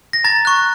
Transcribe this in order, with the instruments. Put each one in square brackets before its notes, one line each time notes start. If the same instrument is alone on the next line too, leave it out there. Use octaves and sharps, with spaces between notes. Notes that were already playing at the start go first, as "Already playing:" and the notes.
[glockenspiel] A#6
A#5 A6
C#6 F#6